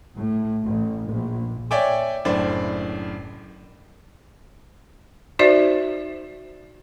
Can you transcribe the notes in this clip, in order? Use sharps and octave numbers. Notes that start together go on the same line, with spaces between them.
A2
A1
A#1
C#5 D5 E5 G5 G#5 D6
F#1 A2 D4 C5 D5
D#4 F#4 C5 D5 E5